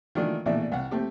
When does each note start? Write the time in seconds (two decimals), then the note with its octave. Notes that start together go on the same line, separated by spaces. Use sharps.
0.15 D#3 E3 F#3 A3 D4 F4
0.46 A#1 B2 E3 A3 D5 E5
0.72 C2 F#5
0.91 A3 C4 G4